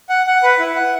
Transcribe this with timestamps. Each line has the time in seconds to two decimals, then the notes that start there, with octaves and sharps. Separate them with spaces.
0.09 F#5
0.27 F#5
0.43 B4
0.59 E4
0.76 F#5